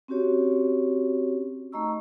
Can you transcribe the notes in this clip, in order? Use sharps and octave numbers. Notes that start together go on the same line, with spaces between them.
C4 C#4 F#4 G4 C#5
A3 D#4 D#5 A#5 C#6 E6